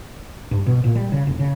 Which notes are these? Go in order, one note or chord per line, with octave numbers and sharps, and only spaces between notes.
G2
B2
A#2
G3
C#3
F1
C#3